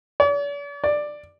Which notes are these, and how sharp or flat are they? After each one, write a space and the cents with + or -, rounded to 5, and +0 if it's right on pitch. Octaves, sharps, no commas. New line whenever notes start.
D5 -45
D5 +10